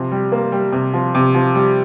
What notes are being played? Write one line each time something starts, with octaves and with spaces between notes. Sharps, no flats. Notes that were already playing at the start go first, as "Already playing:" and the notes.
Already playing: C3 F3
G3
A#3
G3
C3
F3
C3
F3
G3